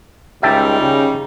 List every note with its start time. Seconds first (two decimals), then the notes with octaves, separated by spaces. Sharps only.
0.43 C#2 D#3 G3 D#4 E5 G5 A5
0.81 C#3